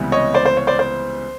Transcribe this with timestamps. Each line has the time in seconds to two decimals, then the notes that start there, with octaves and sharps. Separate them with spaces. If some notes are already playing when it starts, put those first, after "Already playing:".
Already playing: C#2 C3 E3 G3 B3
0.12 C#5 D#5
0.34 C5 D5
0.45 C5
0.57 C#5
0.67 C5 D5
0.79 C5